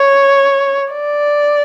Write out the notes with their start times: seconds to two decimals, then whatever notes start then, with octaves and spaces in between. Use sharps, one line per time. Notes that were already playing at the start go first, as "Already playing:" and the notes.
Already playing: C#5
0.94 D5